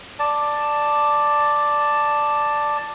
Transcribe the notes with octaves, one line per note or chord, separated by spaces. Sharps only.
D5 A5